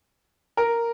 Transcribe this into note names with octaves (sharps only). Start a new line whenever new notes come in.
A#4